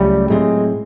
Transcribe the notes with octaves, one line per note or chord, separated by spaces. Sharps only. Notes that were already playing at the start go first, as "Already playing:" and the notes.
Already playing: C#2 C#3 F#3 G3 A3
A2 F#3 G#3 A3 C4